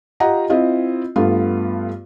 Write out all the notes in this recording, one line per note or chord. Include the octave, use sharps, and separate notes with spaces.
F4 G4 D#5 F#5 A#5
C4 E4 F4 D#5
G2 A3 B3 F4